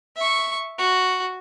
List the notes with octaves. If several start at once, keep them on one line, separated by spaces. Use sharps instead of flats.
E5 C#6
F#4